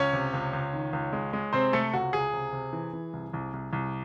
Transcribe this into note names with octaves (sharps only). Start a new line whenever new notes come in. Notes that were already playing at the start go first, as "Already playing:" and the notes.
Already playing: C#2 C#4 C#5
C3
C#2
C#2
D#3
C#2
G#3
G#3
C3 C4 C5
C3 A3 A4
C#2 F#4
C#2 G#4
C3
C3
E3
E3
C2
C2
C2
C2